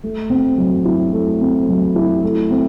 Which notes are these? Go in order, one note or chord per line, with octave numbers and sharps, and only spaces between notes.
A3
C4
F#3
E4
A3
C4
F#3
E4
A3
C4